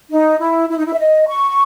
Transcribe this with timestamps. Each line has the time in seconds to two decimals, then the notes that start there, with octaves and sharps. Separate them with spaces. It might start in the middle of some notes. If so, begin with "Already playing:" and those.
0.11 D#4
0.40 E4
0.69 E4
0.78 D#4
0.86 E4
0.93 E5
0.99 D#5
1.28 C#6